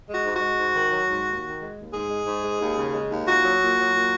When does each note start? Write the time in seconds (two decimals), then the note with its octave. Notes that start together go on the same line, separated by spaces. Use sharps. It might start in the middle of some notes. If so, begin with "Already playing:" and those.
0.08 G#3 F#4
0.24 G#2
0.35 F#4
0.41 G#3
0.59 G#2
0.75 D#3
0.91 F#3
1.08 G#2
1.25 D#2
1.42 D#3
1.60 G#3
1.76 D#2
1.93 G#2 G#4
2.09 G#3
2.26 G#2
2.43 G#3
2.60 D#2
2.77 C#3
2.94 G#3
3.10 D#2
3.27 A#2 F#4
3.44 F#3
3.60 A#2
3.78 F#3
3.94 A#2